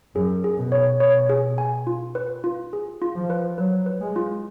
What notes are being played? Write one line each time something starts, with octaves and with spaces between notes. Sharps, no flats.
F#2 G#4
G#4
B2
C#5
B2 C#5
G#4
G#5
F4
B4
F4
G#4
F4
F3
B4
F#3 B4
B4
G#3
F4